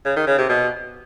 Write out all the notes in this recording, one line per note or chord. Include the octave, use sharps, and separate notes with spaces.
C#3
D#3
C#3
C3
B2